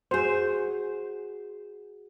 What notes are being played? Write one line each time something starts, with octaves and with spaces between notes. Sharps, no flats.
F#4 G#4 C5